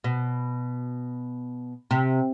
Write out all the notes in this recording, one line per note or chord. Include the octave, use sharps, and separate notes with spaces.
B2
C3